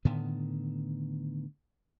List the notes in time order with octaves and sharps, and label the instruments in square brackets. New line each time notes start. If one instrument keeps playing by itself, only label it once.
[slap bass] A2 D3 D#3 B3